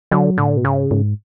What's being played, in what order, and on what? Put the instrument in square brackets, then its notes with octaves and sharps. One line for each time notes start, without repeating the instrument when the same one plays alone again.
[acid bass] D3 [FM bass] F#3
[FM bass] A2 [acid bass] D3
[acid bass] B2
[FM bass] G#2 [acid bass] C#3
[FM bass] G#2